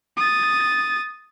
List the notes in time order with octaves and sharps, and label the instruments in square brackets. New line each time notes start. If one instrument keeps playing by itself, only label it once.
[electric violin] D#6 A6